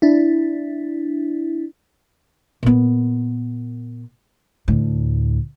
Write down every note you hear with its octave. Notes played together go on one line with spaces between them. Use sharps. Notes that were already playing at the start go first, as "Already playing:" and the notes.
D4 E4
A#2 B3
D2 A2